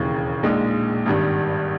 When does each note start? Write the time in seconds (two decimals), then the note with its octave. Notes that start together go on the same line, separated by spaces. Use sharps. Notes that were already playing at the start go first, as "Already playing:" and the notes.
Already playing: E1 D#2 C#3 E3
0.43 A#1 A#2 G#3 D#4
1.06 G#1 G2 D#3 G3